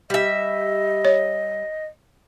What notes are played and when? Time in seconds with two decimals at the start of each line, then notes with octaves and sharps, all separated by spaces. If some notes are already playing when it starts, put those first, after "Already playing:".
0.10 G3 D#5 E5
1.05 C#5